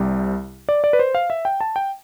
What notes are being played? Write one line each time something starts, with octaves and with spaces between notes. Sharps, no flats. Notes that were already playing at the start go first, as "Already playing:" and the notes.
Already playing: C2 C3 G3
D5
D5
B4
C5
F5
E5
G5
A5
G5